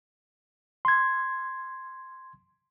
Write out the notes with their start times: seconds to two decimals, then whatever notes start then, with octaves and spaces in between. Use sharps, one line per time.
0.85 C6 G#6